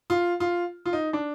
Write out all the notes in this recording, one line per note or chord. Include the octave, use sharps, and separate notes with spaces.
F4
F4
F4
D#4
D4